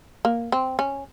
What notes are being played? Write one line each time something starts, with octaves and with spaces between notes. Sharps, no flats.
A#3
C4
C#4